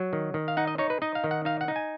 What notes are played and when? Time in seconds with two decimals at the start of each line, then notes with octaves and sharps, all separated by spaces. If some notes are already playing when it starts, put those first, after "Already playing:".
Already playing: F#3
0.13 D#3
0.34 D#3
0.48 F5
0.57 D#4 F#5
0.67 D#5
0.78 D#4 C#5
0.90 B4
1.02 D#4 D#5
1.15 F5
1.24 D#3
1.31 F#5
1.45 D#4 F5
1.61 F#5
1.68 D#4
1.76 G#5